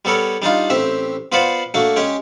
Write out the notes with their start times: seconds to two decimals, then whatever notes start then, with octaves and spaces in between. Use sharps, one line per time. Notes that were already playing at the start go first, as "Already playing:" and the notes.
0.05 G3 B3 A4 A#4 C#5
0.42 G3 D4 D#4 F4
0.70 A1 C4 G4 E5
1.32 B3 F4 B4 C5 D5 F#5
1.74 A3 A#3 D4 F#4
1.96 G#3 C#4 G4 G5